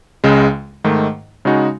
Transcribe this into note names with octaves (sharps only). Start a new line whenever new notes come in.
C#2 C#3 G#3
G#2 D#3 A3
C#3 G#3 D#4 F#4